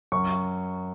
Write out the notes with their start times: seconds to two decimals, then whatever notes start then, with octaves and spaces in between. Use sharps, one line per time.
0.12 F#2 C#6